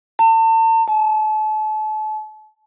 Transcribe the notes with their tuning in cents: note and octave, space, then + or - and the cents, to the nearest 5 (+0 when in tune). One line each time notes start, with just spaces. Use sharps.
A5 +40
A5 -35